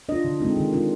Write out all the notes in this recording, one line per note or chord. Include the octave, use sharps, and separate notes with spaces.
D4 F4 D#5
D3
G#3 C4 D#4
D#3
G#3 D4 F4